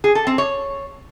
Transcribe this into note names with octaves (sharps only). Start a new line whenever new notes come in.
G#4
A4
C4
C#5